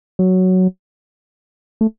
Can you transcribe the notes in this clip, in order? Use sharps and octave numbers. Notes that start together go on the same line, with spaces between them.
F#3
A3